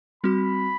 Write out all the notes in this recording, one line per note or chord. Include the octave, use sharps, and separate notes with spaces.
G3 C4 F#4 B5